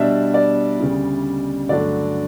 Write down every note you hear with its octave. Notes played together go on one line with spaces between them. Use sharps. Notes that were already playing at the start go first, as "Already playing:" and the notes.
Already playing: B2 G3 D4 E5
D5
D2 C#3 G3
G2 D3 F#3 A3 D4 D5